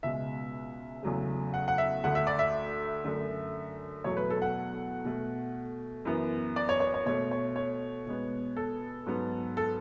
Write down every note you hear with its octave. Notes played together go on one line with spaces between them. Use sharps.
C#2 B2 G#3 E5
E2 C#3 F#3 A3
F#5
F#5
E5
D2 D3 A3 F#5
E5
D5
E5
F#2 D3 A3
E2 B2 F#3 A3 C#5
B4
A4
F#5
B2 A3
F#2 E3 B3
D5
C#5
C#5
C#5
B2 A3 C#5
C#5
C#5
B2 G#3 B3
A4
G#2 F#3 B3
A4